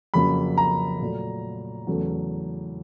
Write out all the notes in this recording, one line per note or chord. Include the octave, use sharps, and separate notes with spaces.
F2 C#3 F#3 A#3 B5
A#5
A#2 F#3 A3
E2 C#3 F#3 A3